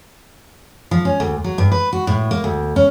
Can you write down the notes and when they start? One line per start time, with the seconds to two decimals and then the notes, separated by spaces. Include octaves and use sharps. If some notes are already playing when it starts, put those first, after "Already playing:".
0.91 F3
1.05 C#4
1.20 D2
1.44 F#3
1.58 G2
1.72 B4
1.93 F#4
2.07 A2
2.31 A#3
2.44 D2
2.76 C#4